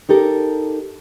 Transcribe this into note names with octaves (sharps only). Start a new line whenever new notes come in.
D#4 G4 A4 A#4